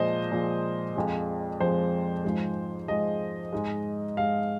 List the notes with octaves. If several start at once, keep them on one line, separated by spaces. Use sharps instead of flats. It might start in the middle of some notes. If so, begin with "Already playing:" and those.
Already playing: A#2 F3 G#3 C5 D#5
A#2 F3 G#3
F2 F3 G#3
F2 F3 G#3 C5
G#2 F3 G#3
G#2 F3 G#3 D#5
G#2 G#3
G#2 G#3 F5